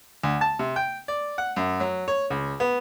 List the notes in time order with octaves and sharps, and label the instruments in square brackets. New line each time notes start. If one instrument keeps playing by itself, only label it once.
[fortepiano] D2
A5
C3
G5
D5
F#5
F#2
F#3
C#5
C#2
B3